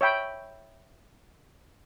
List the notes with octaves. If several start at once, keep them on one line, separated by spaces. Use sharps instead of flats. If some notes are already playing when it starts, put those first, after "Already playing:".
C#5 E5 G5 B5